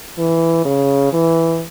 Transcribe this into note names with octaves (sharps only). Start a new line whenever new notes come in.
E3
C#3
E3